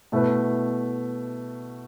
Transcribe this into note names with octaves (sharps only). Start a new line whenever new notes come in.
B2 A3 E4 B4